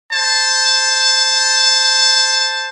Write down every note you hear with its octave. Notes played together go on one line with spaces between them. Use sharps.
C5 A5